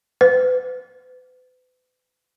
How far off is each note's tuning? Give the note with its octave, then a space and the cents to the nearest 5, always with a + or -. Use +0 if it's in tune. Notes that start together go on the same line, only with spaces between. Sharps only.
B4 +40